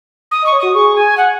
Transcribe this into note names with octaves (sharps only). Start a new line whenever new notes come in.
D#6
D#5
C#6
C#5
F#4 D#6
G#4 C#6
G#5
F#5